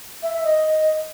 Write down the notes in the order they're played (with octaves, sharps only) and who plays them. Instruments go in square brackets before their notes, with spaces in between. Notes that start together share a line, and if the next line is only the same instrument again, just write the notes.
[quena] E5
E5
D#5